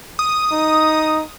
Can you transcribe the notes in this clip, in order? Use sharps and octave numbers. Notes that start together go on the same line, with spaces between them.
D#6
D#4